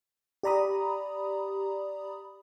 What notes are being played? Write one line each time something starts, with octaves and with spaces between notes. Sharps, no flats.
G4 D5 A#5 B5 D#6